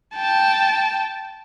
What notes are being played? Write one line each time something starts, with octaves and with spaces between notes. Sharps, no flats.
G5 A5